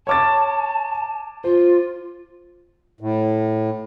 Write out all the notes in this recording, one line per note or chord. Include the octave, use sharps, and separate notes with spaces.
C#5 A5 D6 A6
F4 C5
A2